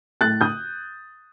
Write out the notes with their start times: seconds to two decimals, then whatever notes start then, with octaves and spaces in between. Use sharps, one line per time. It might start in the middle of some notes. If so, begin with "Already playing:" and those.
0.21 A2 F#6 A6
0.41 D#6 G6